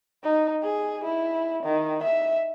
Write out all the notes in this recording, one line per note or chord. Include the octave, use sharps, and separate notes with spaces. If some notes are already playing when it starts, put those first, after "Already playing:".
D#4
G#4
E4
D#3
E5